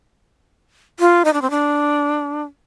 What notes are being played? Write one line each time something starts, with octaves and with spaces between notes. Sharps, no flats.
F4
D#4
D4
C4
D4